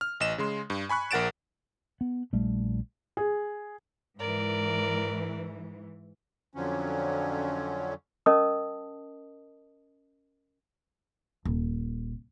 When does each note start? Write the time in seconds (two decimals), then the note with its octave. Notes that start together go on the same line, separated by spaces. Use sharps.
0.01 F6
0.20 A1 D#5 E7
0.38 C#3 G#3 C6
0.70 G2
0.89 G#5 B5 C#6 F#6
1.11 A#1 A#4 F#5 A6 D7 E7
2.01 B3
2.33 A#1 G3 A3
3.17 G#4
4.19 G#2 E3 A#4 D5
6.55 F2 D3 F3 F#3 C#4
8.26 C#4 A#4 D#5 A5 D#6
11.45 D#1